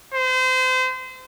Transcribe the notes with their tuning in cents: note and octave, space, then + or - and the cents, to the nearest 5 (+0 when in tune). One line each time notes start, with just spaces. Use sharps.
C5 -30